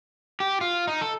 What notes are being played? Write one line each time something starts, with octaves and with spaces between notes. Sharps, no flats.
G4
F4
D#4
A4